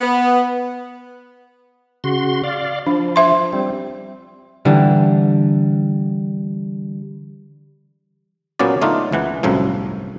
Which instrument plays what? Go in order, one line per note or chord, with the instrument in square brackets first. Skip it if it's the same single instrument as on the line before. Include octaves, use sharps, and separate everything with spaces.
[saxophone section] B3
[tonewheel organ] C#3 F#4 C6
D5 F5
[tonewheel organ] F3 [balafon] D4
[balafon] C5 E5 C6
[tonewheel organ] G3 C4
[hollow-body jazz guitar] D3 E3 G3
[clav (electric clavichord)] A#2 F#3 A#3 B3 C#4 D5
D3 A3 D4 D#4 F4
C#2 E3 F#5
G1 C2 F#2 A2 F3